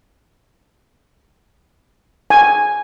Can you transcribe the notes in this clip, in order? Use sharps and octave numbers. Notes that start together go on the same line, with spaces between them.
G#5